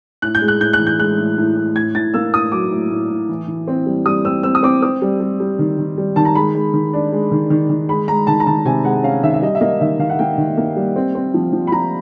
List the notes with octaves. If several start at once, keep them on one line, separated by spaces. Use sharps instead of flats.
A2 F#6
G6
G#3
F#6
A2 G6
F#6
E3
G6
G#3 F#6
A2
A2
A2
A2 G#6
A2 A6
A#3 E6
A2 D#6
F#3 D6
A2
A2
A2
E3
E3
C4
G3
G3 D#6
C4 E6
C4 E6
D#6
C4 D6
C4 D#6
G3
G3
G3
D#3
D#3
G3
D#3 A5
A#5
G#3 B5
G#3
D#3
D4
G#3
D#3
D#3
D#3
G#3 B5
G#3 A#5
D#3 A5
A#5
D#3 A5
C3 G#5
G#3 F#5
C#4 F5
D#3 E5
E5
G3 D#5
E5
A#3 D#5
D#3 E5
D#3 F5
F#5
A#3 G5
D#3
A#3
G3
C4
C4
F3
F3
B5
F3 A#5